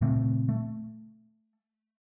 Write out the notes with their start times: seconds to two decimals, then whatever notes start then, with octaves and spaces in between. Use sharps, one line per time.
0.01 A#2 C#3 A3 C4
0.49 A3